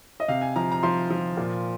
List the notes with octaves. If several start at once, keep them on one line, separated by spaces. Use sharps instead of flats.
D#5
C3 F5
G#5
F3 A#5
A#5
F3 C6
F3
A#2